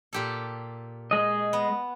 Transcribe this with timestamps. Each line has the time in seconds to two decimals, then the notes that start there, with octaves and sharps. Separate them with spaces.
0.13 A#2 G4 A4
1.11 G#3 D#5
1.53 B3